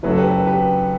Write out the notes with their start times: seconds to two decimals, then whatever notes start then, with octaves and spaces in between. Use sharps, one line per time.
0.03 F#1 F#2 F#3 A3 B4
0.11 A4
0.18 G4 B4
0.47 G4 B4